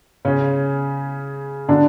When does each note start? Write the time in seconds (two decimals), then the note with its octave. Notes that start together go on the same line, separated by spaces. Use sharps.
0.25 C#3 C#4
1.68 D3 D4